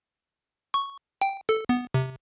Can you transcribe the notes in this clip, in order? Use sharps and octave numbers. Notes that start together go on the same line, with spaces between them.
C#6
G5
A4
B3
C3